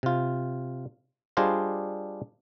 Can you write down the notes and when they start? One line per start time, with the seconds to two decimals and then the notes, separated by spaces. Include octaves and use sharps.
0.03 C3 F4
1.37 G3 D4 F4 G#4 C5 D#5